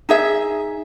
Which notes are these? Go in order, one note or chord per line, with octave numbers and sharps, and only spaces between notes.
D#4 G#4 E5